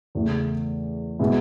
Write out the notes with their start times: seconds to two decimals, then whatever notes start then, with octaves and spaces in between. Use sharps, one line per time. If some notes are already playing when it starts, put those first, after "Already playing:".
0.15 E2 C#3 E3 A3
1.19 B2 G#3 B3 E4